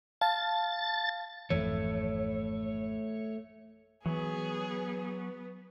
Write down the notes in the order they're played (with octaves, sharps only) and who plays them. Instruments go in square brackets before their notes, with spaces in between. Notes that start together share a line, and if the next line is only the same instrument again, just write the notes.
[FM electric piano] F5 A5 [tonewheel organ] A6
[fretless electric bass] G#1 F2 E3 [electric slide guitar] A3 C#5
[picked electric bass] E3 [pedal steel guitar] F#3 [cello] B3 [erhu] G#4